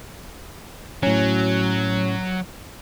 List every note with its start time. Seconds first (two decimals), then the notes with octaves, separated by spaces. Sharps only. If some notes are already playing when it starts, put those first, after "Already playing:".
1.03 A2 F#3 C#4